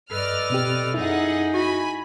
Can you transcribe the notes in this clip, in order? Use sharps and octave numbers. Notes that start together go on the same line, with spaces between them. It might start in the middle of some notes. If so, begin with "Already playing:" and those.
G2 A4 B4 D5 D#5 F6
B2 C4 G4
F#2 D#4 E4 G#4 F#5
F#4 G#5 B5